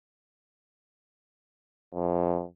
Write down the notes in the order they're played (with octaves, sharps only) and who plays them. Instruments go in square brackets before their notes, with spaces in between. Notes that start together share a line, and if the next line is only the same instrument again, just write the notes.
[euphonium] F2